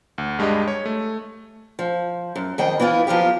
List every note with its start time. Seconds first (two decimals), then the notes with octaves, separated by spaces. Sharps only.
0.18 D2
0.39 G2 G#3 D4 G4 D#5
0.68 C#5
0.86 A3
1.79 F3
2.36 F#2
2.58 F2 D#3 D#5 G5
2.80 E3 B3 E4 F4
3.07 F3 F#3 F4 G4